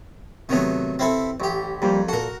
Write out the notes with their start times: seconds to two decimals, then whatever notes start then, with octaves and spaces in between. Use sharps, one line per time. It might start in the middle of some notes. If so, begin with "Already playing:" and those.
0.49 C3 D#3 F#3 A3 B3
0.99 C4 E4 A4
1.40 A1 G4
1.82 F2 G3 A#3 G4
2.08 A#2 F#4 A4 A#4